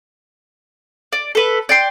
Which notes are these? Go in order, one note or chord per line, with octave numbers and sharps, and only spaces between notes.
D5
A4 B4
D5 G5 C6